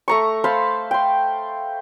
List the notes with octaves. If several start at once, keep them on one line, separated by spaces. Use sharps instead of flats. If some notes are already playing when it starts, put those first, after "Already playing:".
A3 A#5 C#6
C5 F5 A5 B5
G5 C6